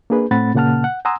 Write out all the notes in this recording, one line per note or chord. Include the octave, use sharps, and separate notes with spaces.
A#3 D4 G#4 B4
A2 A3 C4 F#5 B5 A6
A#2 C#3 A#3 F#5 A5 F6
F#5
F#5 G#5 A#5 C6 D#6 E6